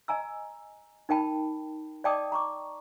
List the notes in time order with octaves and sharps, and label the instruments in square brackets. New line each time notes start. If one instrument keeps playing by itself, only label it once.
[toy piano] D#5 G#5 A#5 E6
D#4 A#4 G5 A5 B5
D5 D#5 G5 A5 D6 D#6
A#5 C#6 D6